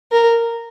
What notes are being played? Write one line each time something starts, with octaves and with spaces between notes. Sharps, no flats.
A#4